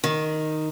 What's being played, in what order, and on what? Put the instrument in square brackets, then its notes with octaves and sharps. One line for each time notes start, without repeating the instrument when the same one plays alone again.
[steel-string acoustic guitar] D#3